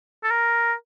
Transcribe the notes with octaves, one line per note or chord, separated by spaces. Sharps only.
A4
A#4